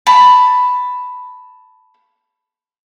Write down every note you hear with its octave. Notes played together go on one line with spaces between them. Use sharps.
A5 B5